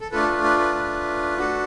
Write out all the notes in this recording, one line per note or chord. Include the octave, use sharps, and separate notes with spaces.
A4
A3 D4 F4 A4 B4
A4
B4
B4
B4
B4
D4 F#4 A4